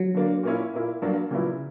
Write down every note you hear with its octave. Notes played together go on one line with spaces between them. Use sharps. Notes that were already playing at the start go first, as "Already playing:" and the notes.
Already playing: F#3
D3 A#3 D4
A#2 A#3 C#4 E4
A#2 A#3 E4
G2 F#3 A#3 D4 F#4
A#2 C#3 F#3 B3 E4